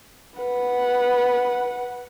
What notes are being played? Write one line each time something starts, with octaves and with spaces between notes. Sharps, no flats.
B4 F#5